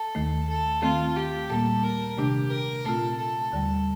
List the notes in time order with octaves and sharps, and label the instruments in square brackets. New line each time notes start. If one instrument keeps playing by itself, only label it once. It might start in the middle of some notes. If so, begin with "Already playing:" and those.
Already playing: [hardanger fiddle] A4
[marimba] D#2 D#3 A3
[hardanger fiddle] A4
[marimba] D#3 A3 C4 [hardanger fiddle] F4
[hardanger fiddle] G4
[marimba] A#2 G3 A#3 [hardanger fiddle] A4
[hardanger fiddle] A#4
[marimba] C3 D#3 A3 D4 [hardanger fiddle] G4
[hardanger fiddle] A#4
[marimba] A#2 A3 C4 F4 [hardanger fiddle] A4
[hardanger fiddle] A4
[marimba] D#2 D3 G3